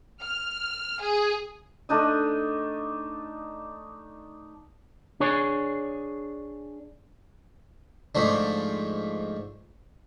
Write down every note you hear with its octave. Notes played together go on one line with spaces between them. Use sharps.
F6
G#4
A3 D4 D#4 D#5
D4 G#4 C#5
G#2 F3 A3 D4